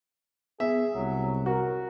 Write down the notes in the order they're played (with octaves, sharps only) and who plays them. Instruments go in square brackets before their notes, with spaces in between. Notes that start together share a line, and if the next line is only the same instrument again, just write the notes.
[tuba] B3 [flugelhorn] G#4 [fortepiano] E5
[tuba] C2 [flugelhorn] F#3
[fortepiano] F#4 [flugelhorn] A#4